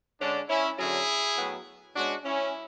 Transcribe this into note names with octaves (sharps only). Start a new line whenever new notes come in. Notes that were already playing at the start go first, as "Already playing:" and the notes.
D3 G#3 C#4 D4
C#4 E4
F#2 D3 F#3 C#4 E4 G#4
A2 F#3 B3
B2 G#3 C#4 D4 F#4
C#4 E4